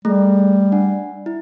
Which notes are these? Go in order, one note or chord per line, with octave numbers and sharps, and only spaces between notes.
G3 A3 G#4
D4 F#5
E4